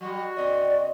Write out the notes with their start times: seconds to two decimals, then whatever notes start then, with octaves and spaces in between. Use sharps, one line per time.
0.01 F#3 G3 F#4
0.37 C#3 C4 D5 D#5